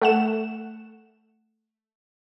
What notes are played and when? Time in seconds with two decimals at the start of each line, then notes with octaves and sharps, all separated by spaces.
0.01 A3 F#5 E7